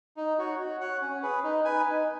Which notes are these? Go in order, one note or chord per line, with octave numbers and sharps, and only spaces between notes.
D#4
F#4 C#5
F#4
C#5 F#5
C#4
G#4 B4
D#4
B4 G#5
D#4